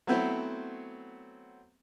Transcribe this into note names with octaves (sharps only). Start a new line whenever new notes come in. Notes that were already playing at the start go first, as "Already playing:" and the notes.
F#3 A3 B3 C4 E4 C5